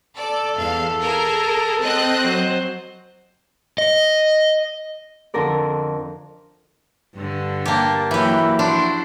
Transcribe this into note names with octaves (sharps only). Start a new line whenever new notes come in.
A4 D5
E2 F5
G#4 A#4
C4 D#5 F#6
F#3 C5
D#5
F2 D3 A4 A#4 D5
G2 D3
A#3 G4 A5
E3 F#3 A#3 E4 G4
F3 D4 E4 F#4 C6